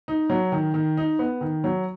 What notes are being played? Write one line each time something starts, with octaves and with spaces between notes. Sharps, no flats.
D#4
F#3
D#3
D#3
D#4
B3
D#3
F#3